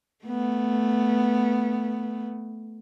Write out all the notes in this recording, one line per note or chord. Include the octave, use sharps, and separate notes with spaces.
A3 B3